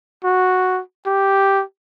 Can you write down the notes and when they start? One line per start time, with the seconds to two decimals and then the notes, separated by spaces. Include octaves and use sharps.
0.24 F#4
1.06 G4